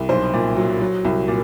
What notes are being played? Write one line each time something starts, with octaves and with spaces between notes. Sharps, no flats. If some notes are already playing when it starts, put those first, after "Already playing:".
Already playing: C2
B1 C5
A#2
F#3
F#3
C2
A#2